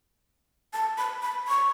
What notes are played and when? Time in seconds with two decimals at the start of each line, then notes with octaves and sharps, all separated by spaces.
0.73 A5
0.98 B5
1.22 B5
1.48 C#6